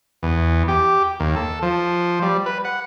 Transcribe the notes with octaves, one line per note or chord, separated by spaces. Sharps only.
E2
G4
D#2
A4
F3
G3
B4
F#5